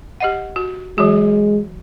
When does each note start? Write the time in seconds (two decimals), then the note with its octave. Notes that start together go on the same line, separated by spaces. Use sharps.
0.20 G4 D#5 F#5
0.56 F#4
0.98 E3 F#3 G#3 F#4